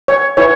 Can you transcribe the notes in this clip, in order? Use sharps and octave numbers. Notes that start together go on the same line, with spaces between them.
C#5
E4 B4 C#5